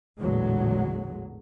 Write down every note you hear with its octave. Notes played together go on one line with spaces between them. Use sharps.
A1 E2 A#2 D3 F#3 G#3